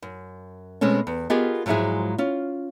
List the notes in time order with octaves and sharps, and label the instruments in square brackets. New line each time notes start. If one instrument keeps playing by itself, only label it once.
[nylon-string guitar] F#2
B2 G#3 A3 C4 C#4
E2
B3 F4 G4 G#4 A#4 D#5
G#2 F3 F#3 G#3 E4 G#4
C#4 F4